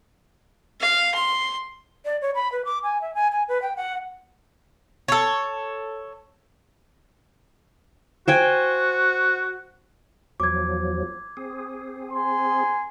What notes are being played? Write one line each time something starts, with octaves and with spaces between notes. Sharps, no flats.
F5
C6
D5
C#5
B5
B4
D6
G#5
E5
G#5
G#5
B4
G5
F#5
A4 C#5
F#4 C5 G5 G#5
E2 F3 F#3 D6 G#6
C4 G#4
G#5 C6